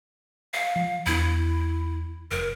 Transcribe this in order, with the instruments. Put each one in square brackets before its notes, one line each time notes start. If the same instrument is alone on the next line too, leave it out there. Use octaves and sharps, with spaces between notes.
[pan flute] F5
[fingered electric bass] F3
[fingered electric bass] E2 B3 D4 [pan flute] E4
[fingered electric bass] F1 [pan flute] A#4